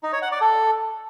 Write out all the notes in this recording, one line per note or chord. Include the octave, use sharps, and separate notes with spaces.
D#4
C#5
F#5
D5
A4